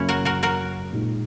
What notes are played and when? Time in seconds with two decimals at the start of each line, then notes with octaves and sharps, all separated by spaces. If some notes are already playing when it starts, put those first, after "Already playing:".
Already playing: F#2 C#3 F#3 A#3 C#4 E4
0.09 F#4 A#4
0.25 F#4 A#4
0.43 F#4 A#4
0.92 A#2 G#3 D#4